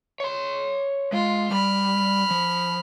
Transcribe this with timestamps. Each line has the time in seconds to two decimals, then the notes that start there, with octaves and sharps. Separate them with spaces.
0.20 C#5 C6
1.13 G#3 F4
1.51 G3 B5 F6
2.31 F3